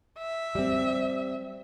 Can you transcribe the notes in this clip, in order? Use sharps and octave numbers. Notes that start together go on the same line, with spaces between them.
E5
G3 C4